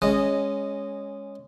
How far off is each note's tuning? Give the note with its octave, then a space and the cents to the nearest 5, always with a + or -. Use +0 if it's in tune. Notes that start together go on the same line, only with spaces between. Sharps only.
G#3 -10 C#4 +0 D#5 -15